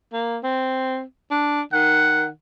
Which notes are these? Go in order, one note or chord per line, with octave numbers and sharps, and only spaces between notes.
A#3
C4
D4
D#3 F#5